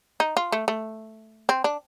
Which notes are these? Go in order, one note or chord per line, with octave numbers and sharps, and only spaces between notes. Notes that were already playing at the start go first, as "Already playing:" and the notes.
D#4
F4
A3
A3
C4
D4